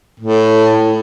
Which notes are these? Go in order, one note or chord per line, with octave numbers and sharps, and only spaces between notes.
A2